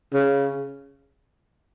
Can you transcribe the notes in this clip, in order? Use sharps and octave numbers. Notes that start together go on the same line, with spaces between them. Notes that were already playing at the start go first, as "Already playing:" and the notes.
C#3